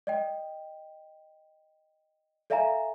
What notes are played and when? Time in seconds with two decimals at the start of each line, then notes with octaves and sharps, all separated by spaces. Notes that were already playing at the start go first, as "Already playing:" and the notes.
0.07 D5 D#5 G5
2.50 A4 D5 E5 F5 G#5 A#5